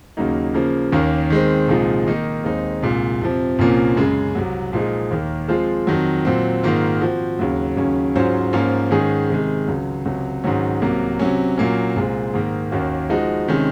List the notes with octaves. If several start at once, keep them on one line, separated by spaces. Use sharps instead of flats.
D#2 C#3 F#3 A#3 D#4
C#3 F3 A#3
D#2 D#3 A#3 C#4
D#3 G#3 C4
C2 A#2 F3 G#3 D#4
D#3 A#3 D#4
D#2 D#3 G#3 C4 D#4
C2 A#2 G#3
F2 C3 F3
C2 A#2 F3 A#3 C#4
F#2 C#3 G#3
C2 C3 F#3
A#2 F3 G#3 D#4 G#4
D#2 D#3 A#3
F3 G#3 C4 F4 C5
F2 D#3 F#3
A#2 F#3 C4
G#2 D#3 A#3 F4
F3 C4 F#4
D#2 C#3 F#3
D#2 C#3 F#3 C#4
G#2 F#3 C#4 F4 C5
G#2 F3 A#3 C#4 F4
G#2 D#3 G#3 C#4 G#4
C3 D#3 G#3
C#2 C#3 F#3
C#2 C3 F#3 C#4
G#2 D#3 F#3 C#4
C2 C3 F#3 A#3
C3 F#3 C#4
A#2 F#3 A#3 C#4
C2 A#2 G#3 C4
G#2 D#3 A#3
D#2 D#3 A#3 C#4 F#4
F3 G#3 D#4 F#4
C3 D#3 G#3 C#4